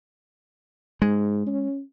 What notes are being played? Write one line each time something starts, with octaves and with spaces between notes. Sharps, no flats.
G#2 G#3
C#4